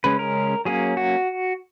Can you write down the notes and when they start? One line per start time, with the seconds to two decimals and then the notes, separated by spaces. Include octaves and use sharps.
0.04 C#3 G#3 C#4 B4
0.19 A#4
0.65 F#3 A#3 C#4 G#4
0.97 F#4